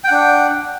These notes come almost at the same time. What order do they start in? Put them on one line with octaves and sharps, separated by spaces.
G5 F#5 D4